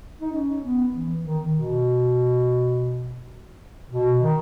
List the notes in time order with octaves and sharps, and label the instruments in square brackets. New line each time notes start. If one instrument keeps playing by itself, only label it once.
[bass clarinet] D#4
C#4
B3
E3
D#3
B2
B2
D#3